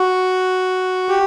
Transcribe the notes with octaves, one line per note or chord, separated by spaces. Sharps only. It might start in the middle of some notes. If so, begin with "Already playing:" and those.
Already playing: F#4
G4